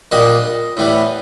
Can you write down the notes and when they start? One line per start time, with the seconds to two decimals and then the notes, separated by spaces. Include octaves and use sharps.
0.11 A#1 A#2 G3 A#3 D4 D#5
0.77 A2 E3 G3 B3